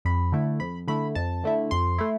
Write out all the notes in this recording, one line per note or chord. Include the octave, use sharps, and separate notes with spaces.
F2 B5
D3 A3 E4
F2 B5
D3 A3 E4 B5
F2 A5
D3 A3 E4
F2 C6
A3 E4